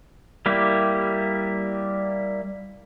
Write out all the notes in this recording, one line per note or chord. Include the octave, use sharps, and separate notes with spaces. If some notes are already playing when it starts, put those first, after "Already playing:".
G3 A#3 E4 G4